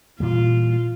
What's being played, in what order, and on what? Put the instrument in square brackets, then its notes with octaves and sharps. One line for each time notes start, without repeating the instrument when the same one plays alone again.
[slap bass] A#2 E3 G3 [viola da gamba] F4